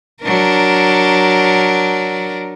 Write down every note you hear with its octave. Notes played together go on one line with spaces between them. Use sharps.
F#3 D4 A#4